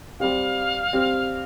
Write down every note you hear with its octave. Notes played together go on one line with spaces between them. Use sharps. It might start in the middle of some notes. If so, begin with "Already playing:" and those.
G3 C4 G4 F5
G3 C4 G4